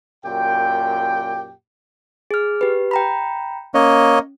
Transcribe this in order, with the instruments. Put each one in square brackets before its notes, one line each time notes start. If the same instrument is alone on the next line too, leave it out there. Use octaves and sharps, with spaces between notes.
[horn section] F#2 A#2 G4 G5
[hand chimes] G#4 F6
G4 B4
G5 A#5 B5
[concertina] A#3 C#5 D#5 [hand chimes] C#4